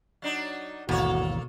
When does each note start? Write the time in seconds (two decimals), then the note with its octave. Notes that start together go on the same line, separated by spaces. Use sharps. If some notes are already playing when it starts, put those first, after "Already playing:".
0.22 F#3 D4 D#4
0.89 G#1 D#2 B2 E3 A#3 F#4 A4 C#5